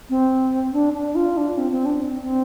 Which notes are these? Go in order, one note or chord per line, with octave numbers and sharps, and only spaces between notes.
C4
D4
D4
F4
D4
C4
C4
D4
C4
C4